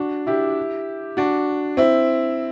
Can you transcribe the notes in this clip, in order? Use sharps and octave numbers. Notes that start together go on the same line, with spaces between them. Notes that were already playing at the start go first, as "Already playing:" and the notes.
Already playing: D4 F#4
E4 G4
D4 F#4
C4 E4